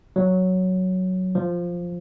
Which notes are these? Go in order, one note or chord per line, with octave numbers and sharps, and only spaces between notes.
F#3
F3